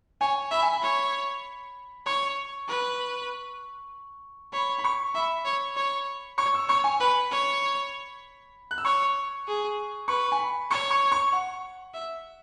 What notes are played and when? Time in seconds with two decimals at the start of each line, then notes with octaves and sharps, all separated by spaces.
0.21 C#5 G#5
0.51 E5 B5
0.63 G#5
0.74 B5
0.82 C#5
2.06 C#5 C#6
2.68 B4
4.53 C#5 B5
4.79 B5
4.84 C#6
5.14 E5 B5
5.45 C#5
5.76 C#5
6.38 C#5 C#6
6.54 E6
6.69 C#5 C#6
6.84 G#5
7.00 B4 B5
7.31 C#5
8.71 F#6
8.78 E6
8.85 C#5 C#6
9.47 G#4
10.08 B4 C#6
10.32 G#5
10.39 B5
10.70 C#5 C#6
10.91 C#6
11.12 C#6
11.32 F#5
11.94 E5